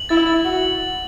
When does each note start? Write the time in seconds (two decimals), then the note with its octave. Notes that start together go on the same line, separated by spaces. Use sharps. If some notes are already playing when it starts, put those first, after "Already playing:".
Already playing: F#7
0.09 E4 A6
0.27 A6
0.45 F#4 F#7